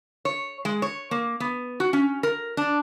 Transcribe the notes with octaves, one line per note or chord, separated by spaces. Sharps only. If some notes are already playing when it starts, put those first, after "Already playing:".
C#5
G#3
C#5
A#3
B3
F#4
C#4
A#4
D4